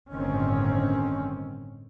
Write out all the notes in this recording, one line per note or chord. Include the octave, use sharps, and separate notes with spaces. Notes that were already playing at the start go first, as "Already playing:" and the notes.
G1 A2 D3 D#3 C4 C#4